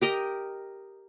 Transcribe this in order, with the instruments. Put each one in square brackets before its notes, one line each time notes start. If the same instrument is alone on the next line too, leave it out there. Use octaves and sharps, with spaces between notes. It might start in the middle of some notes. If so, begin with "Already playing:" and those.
[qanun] G4 A#4 D#5